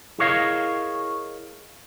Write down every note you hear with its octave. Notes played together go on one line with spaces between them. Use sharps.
E4 G#4 A#4 C#5 D#5 F5